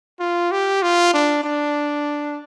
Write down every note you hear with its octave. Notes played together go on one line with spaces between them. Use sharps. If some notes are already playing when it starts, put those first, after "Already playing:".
F4
G4
F4
D4
D4